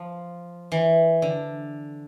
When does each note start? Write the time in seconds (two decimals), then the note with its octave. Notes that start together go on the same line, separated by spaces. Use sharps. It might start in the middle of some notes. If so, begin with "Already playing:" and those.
Already playing: F3
0.72 E3
1.22 D3